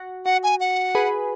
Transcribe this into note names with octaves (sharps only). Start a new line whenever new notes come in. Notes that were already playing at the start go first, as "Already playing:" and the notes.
Already playing: F#4
F#4 F#5
G#5
F#5
G#4 B4